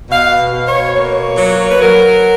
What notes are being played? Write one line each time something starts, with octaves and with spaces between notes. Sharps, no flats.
B2 F5
B2
C#5
A#3 C#5
F#3
B4
F#3 A#4